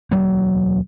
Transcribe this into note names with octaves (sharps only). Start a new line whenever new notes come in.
E1 D2 F#3 A#3